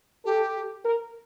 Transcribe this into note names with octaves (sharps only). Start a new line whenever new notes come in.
G4 A4
A#4